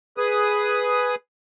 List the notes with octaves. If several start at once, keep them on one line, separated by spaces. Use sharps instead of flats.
G#4 B4 D#6